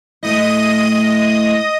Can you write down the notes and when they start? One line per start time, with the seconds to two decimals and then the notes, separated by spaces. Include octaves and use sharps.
0.23 A2 A3 E4 D#5 D#6